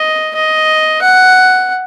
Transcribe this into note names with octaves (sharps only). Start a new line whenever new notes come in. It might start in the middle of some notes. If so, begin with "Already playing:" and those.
Already playing: D#5
D#5
F#5